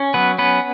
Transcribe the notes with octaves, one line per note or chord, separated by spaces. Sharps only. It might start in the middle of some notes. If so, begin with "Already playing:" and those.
Already playing: C#4
F#3 B3 B4
B3 C#4 B4